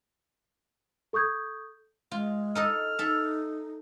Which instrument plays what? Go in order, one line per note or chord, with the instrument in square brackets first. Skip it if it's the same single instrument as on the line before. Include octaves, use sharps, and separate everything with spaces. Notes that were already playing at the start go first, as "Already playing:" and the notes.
[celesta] A4 C#6 D#6 G6 G#6
[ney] G#3 [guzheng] F4
[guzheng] D#4 A4 D#5 [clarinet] F6
[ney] D#4 [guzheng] A4 E5